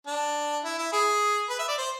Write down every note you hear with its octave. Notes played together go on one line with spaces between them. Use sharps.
D4
E4
E4
G#4
B4
E5
D5
C5